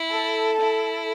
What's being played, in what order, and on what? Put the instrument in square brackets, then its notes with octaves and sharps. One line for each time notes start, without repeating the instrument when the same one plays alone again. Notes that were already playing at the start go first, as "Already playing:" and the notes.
Already playing: [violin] E4
[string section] A4
[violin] E4